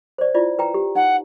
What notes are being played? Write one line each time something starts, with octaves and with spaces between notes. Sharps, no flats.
C5 D5
E4 F4 D5
B4 G5 A#5
G4
D#4 F#5